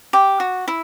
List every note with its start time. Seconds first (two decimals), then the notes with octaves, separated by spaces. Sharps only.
0.13 G4
0.40 F#4
0.68 E4